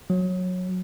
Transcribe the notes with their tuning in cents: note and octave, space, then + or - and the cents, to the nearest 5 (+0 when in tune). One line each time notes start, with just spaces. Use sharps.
F#3 -20